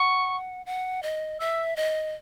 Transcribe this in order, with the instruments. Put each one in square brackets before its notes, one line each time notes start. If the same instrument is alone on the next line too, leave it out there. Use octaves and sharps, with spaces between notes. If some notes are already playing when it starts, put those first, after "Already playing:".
Already playing: [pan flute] F#5 [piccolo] C#6
[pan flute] F#5
D#5
[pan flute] E5 [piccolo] E6
[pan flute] D#5